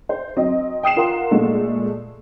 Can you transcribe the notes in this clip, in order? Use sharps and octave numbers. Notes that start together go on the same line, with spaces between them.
C5
F#3 C4 D#5
G5 D#6 C7 E7
F4 A#4 F#5 C6
A#2 G#3 A3